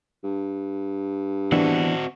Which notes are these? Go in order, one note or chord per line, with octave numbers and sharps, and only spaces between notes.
G2
E3 B3 C4 D4 F#4